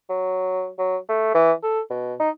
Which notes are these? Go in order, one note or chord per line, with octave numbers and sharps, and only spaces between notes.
F#3
F#3
A3
E3
A4
B2
D#4